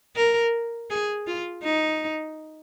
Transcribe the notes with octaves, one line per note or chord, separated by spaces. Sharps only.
A#4
G#4
F4
D#4